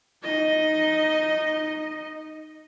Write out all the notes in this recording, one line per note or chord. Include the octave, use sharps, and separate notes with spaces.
D#4 D#5